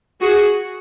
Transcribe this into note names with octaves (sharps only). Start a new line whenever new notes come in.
F#4 G#4